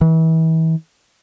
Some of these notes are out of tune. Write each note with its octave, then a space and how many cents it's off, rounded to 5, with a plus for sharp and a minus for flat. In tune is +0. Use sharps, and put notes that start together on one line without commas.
E3 -35